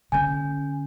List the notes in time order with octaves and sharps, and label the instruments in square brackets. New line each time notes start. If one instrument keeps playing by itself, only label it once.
[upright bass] D3 C#4 [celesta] G#5 G6